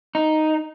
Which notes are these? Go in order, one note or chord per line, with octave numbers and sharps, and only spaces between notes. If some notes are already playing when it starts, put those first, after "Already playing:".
D#4